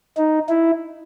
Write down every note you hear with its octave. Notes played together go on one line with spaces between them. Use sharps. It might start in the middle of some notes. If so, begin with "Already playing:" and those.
D#4
E4